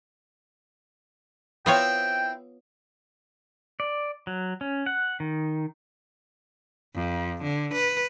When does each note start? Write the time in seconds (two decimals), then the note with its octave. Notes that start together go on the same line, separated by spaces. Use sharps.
1.66 B3 C4 E4 F4 C#5 G5
3.80 D5
4.27 F#3
4.61 C#4
4.86 F#5
5.20 D#3
6.94 F2
7.43 D3
7.73 B4